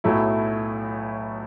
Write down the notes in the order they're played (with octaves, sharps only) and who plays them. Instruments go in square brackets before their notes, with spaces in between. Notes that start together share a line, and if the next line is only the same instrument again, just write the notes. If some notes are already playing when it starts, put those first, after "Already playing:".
[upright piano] B1 A2 F#3 A3 E4